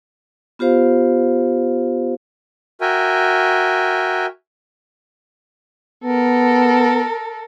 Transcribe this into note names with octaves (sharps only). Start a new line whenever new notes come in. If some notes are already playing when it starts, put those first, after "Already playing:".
B3 F4 G4 C5 F5
F#4 A#4 E5 G5 G#5
B3 A4 A#4